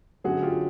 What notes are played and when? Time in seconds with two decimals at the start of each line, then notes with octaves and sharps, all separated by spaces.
0.24 F#2 D3 F#3 F#4 G#4
0.42 F4 G4